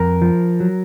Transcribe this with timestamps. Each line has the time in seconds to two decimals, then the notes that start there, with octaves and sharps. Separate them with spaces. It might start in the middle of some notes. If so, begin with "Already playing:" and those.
Already playing: F2 A#4
0.22 F3
0.60 F#3